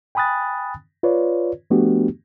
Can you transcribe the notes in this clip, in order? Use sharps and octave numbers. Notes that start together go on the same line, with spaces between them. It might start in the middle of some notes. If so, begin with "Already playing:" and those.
G5 G#5 B5 D#6 F#6 A6
F4 B4 C#5 D5
F3 A3 B3 D4 F#4 G4